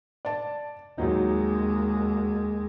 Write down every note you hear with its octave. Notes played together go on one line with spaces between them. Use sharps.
D5 A5
D#2 F#3 G#3 D#4